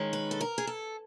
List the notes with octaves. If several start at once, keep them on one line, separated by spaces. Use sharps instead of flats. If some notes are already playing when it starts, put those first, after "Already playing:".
Already playing: D#3 G#3 C#4
B4
A4
A#4
G#4
A4